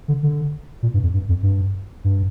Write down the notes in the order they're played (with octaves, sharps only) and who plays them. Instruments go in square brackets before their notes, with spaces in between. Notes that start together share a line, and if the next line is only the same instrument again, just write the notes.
[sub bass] D3
D3
A#2
G2
F2
G2
F2
G2
G2